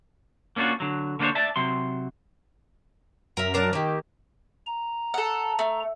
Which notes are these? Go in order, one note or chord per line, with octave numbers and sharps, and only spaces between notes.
A#3 C#4 D4 F4 F#4
D3 F#3
D3 A#3 D4 F4 C5 C#5
D5 E5 A5
C3 F#3 C6
F#2 A#4 E5
F#3 D4 A#4 A5
D#3 A#3 G4
A#5
A4 F#5
A3